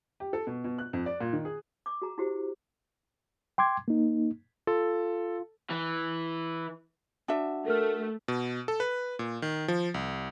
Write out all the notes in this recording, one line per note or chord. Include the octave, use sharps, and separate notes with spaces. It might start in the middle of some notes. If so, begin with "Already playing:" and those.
G4
A4
B2
B2
F#6
F2
D5
A#2
D#3
G#4
D6
F#4 G#4 A#5
E4 F#4 G4 C5
G5 C6 D6 G#6
A#3 D#4
F4 A4
E3
D4 F#4 E5
A3 A4 A#4 F6
B2
A4
B4
A#2
D#3
F3
C2